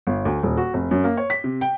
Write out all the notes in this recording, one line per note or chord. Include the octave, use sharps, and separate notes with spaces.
G1
D2
D#1
F#4
F1
F#2
A#3
C#5
B6
C3
G5